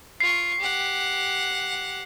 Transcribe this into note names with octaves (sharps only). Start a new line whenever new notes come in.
F4 C#6 C7
G4 F#5